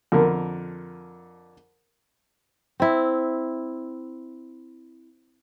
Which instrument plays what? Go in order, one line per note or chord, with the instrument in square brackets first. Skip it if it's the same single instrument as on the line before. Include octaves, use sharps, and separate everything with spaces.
[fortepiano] F2 D3 A#4
[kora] C4 E4